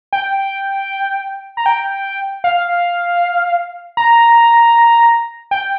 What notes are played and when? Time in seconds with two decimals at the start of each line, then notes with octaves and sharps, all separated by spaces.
0.13 G5
1.57 A#5
1.66 G5
2.44 F5
3.97 A#5
5.51 G5